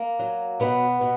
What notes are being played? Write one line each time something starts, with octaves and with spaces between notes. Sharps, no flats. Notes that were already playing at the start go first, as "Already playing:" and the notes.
Already playing: A#3
F#3
B2 B3
B2